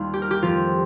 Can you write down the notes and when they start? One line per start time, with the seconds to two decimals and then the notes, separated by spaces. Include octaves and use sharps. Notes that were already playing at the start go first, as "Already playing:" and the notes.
Already playing: D#2 D#3 G3 F4
0.14 G4
0.22 A#4
0.31 G4
0.42 F2 F3 F4